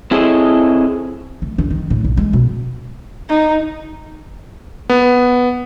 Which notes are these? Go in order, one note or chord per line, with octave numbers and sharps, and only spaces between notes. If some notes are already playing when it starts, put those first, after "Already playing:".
C4 E4 G#4 A4 C#5 D#5
A3
D3
D#3
A2
B1
G#3
B2
D#4
B3